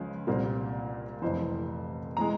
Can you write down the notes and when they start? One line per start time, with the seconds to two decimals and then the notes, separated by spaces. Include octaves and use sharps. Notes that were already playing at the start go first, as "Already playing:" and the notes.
Already playing: C#2 C#3 F3 G#3
0.27 C2 A#2 G3 A#3 C5
1.22 F1 F2 E3 C5
2.17 E3 G#3 A#5